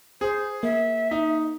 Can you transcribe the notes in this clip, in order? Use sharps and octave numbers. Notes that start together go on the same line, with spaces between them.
G#4 C5
A#3 E5
D#4